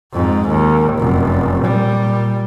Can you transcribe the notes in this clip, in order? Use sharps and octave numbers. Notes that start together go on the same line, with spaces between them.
F2 G#2
D#2
F1 F#2
A#2 G3